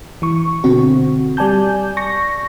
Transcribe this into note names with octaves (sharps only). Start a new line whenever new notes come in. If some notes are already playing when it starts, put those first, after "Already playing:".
E3 C#6
B2 D3 C4 F#4
G3 D5 G#5 A5 G6
C#6 A#6